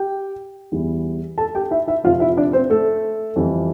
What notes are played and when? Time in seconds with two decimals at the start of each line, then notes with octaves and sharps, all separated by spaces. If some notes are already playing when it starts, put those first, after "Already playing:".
Already playing: G4 G5
0.72 E2 E3 G3
1.38 A4 A5
1.55 G4 G5
1.71 E4 E5
1.87 E4 E5
2.04 F2 C3 F3 F4 F5
2.20 E4 E5
2.37 D4 D5
2.53 C4 C5
2.70 A3 A4
3.36 F2 E3 G3